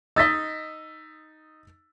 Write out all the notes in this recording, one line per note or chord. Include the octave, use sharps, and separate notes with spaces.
D#4 D#5 E6 A6 B6